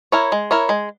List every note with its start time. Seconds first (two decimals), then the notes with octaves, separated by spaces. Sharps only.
0.12 E4 A#4 C#5
0.32 G#3
0.51 E4 A#4 C#5
0.69 G#3